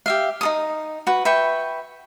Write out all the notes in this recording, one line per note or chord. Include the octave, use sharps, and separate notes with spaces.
G4 E5 F5
D#4 A4 D#6
F#4 B4
B4 E5 G5 C#6